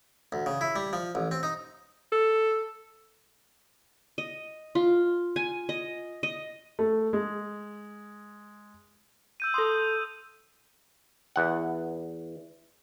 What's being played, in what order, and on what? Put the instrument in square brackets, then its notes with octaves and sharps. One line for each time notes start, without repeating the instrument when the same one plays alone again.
[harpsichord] D2
C#3
E4
G3
F3
A1
C4
D#4
[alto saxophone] A4
[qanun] D#5
F4
G#5
D#5
D#5
[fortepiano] A3
G#3
[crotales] E6 G6 D#7
[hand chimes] A4 C6 [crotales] D#6
[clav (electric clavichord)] E2 F#5